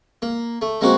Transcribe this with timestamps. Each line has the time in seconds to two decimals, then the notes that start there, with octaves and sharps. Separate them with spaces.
0.22 A#3
0.61 A3
0.81 G#3 A#3 C4 F#4 C5